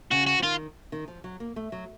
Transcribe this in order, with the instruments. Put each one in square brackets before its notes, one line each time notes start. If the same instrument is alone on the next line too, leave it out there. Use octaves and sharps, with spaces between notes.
[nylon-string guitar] C#3 [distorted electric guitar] F#4
[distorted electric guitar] F#4
[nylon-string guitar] F3
[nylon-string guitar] D#3 [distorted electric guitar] F4
[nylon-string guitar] D#3
F3
F#3
A#3
A3
F#3